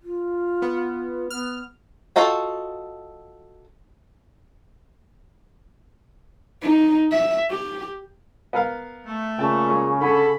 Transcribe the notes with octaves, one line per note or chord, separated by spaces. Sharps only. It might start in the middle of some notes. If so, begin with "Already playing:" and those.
F4
B3
B3 F6
F4 F#4 A4 D#5 G5
D#4
E5
G4
B3 A#4 F5
A3
A#2 C#3 G5 A5
G#3
D3 C#4 A4 B5